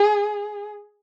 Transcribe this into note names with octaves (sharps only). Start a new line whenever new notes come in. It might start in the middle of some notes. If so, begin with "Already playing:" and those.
Already playing: G#4